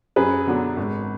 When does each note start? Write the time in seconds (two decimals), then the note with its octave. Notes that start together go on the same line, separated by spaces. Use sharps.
0.16 F#2 G#4 B4
0.47 D3 F#3 B3 D4
0.77 G#1